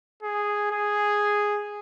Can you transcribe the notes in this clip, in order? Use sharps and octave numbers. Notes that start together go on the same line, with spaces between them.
G#4
G#4